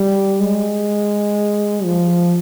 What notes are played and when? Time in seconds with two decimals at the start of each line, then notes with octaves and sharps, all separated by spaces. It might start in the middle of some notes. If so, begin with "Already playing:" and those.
Already playing: G3
0.40 G#3
1.84 F3